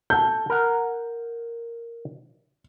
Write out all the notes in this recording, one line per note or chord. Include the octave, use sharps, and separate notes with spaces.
A4 G6
A#4 F#5